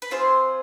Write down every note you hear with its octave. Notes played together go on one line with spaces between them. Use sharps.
B4
C4 F4 G#4 C5